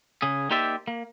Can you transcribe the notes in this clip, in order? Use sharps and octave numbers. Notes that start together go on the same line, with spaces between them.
C#3 G#4
A#3 D#4 G4 C5 D5 E5
A#3